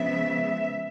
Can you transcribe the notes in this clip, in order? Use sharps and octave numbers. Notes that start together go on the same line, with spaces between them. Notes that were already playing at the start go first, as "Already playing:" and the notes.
Already playing: C#3 F3 G#3 B3 E5